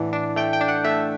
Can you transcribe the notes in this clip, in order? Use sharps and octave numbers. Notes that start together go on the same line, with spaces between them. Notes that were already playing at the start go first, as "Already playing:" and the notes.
Already playing: A2 E3 D4 F#5
D4
A3 G5
G5
D4
F#5
A3 E5